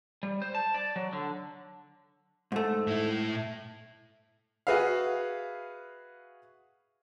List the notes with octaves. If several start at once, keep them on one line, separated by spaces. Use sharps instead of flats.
G3
C5
A5
D5
F#3
D3
G#2 A3
A2 E4
F#4 G#4 B4 E5 F5